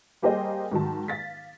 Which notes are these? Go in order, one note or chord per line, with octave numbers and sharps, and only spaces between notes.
G3 A#3 G4 G#4 C5 D#5
G#2 D#3 F#3 A5
F5 A6 B6